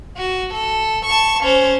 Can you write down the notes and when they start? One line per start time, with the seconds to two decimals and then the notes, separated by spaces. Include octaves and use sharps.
0.17 F#4
0.53 A4
1.05 A5 C#6
1.43 C#4 C5